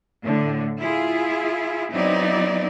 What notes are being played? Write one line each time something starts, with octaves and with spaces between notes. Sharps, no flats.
A2 D3
E4 F4 G#4
F#3 B3 C4 D#4 E4 D5